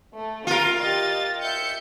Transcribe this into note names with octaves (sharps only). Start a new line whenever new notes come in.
A3
F4 A#4 F5
G4 D#5 A6
E5 G6 C#7